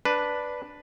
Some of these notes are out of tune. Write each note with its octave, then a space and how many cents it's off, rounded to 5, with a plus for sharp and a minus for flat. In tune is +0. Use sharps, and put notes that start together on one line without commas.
D4 +0 B4 +0